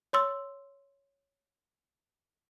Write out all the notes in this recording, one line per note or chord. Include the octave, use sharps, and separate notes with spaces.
C#5 C6 E6